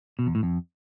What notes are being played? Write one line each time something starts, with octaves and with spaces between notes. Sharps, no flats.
B2
E2
A2
F2